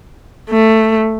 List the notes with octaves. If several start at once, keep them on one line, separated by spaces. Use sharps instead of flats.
A3